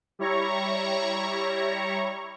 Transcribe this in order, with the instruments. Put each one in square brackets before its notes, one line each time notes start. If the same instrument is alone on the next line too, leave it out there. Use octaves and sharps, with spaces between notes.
[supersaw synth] G3 E4 C#5 A#5 C#6